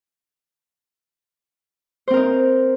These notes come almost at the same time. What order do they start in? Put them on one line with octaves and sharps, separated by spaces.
C5 C4 A#4 D#4